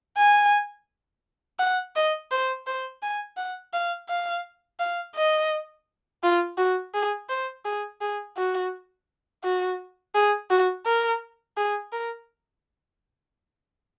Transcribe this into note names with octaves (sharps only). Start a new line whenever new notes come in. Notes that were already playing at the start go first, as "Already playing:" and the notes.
G#5
F#5
D#5
C5
C5
G#5
F#5
F5
F5
F5
D#5
F4
F#4
G#4
C5
G#4
G#4
F#4
F#4
G#4
F#4
A#4
G#4
A#4